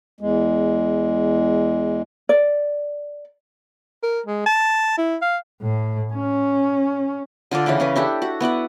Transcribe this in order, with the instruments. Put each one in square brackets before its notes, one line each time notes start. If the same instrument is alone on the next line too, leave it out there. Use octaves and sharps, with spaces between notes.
[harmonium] E2 G#3
[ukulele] D5
[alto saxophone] A#4
G#3
A5
E4
F5
[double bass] A2
C#4
[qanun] D3 F4 A4 D5
C#3 E3 B4 D5
C#4 G#4 B4
D4 E4 G4 A4
F#4 F#5
B3 E4 D5 F#5